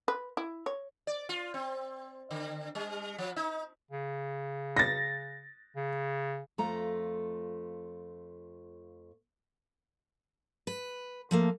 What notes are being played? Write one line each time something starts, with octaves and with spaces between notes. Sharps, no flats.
B4
E4
C#5
D5
F4
C4
D3
G3
F3
D#4
C#3
A6 A#6
C#3
F2 A3 F4 A#5
B4
F3 A3 A#3